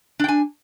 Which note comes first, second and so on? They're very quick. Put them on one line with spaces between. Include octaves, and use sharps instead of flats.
D4 G5 G#5